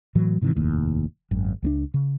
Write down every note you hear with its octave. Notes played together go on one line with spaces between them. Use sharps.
A2 E3 F#3
G#2 C3 D#3 E3
F1 D#2 A2
G#1 F#2
C#2 G#3 D4
C#3